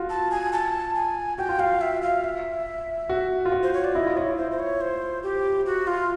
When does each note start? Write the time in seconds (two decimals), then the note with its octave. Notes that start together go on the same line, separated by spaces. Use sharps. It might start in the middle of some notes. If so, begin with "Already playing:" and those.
Already playing: F4 F#4
0.10 A5
0.31 G#5
0.53 A5
0.95 G#5
1.38 F#4 G5
1.49 F4
1.59 F#4 F5
1.81 E5
2.02 F5
2.24 E5
3.09 F#4
3.45 F4
3.52 F#4
3.63 C5
3.73 C#5
3.84 D5
3.95 E4 D#5
4.06 F4
4.17 E4 C#5
4.37 C5
4.51 C5
4.59 C#5
4.81 C5
5.23 G4
5.66 F#4
5.87 F4